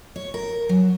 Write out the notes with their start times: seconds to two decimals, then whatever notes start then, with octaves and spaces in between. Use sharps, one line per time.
0.16 C#5
0.34 A#4
0.69 F#3